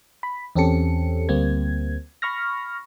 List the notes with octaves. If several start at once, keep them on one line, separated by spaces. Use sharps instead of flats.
B5
E2 C4 C#4 G4 A4 C#7
D2 G3 A#3 C4 G#6
B5 C#6 F6 A#6